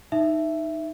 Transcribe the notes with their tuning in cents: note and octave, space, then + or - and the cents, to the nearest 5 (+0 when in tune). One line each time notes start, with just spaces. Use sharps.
D#4 +0 E5 +5